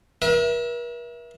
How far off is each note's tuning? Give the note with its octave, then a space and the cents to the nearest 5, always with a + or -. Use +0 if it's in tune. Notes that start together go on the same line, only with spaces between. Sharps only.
A#4 +45 E5 +0